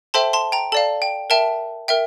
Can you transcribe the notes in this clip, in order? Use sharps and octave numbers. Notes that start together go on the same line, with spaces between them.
A4 C5 E5 G5 A5 C6
A5 C6
G5 A#5
A4 D5 F5 A5
G5
A#4 E5 G5 A5
A#4 E5 G5